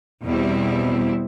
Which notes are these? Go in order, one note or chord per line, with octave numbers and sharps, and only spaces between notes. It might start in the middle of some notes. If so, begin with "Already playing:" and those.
E2 B2 G3 C4 E4